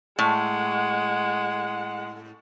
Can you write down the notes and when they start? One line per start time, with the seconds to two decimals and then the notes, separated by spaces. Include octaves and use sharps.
0.19 A2 G#3 F#5